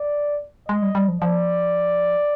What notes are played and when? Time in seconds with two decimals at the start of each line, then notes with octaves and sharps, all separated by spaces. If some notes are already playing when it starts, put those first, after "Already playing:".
Already playing: D5
0.68 G#3 D#5
0.82 G3
0.95 G3
1.08 F3
1.22 F3 D5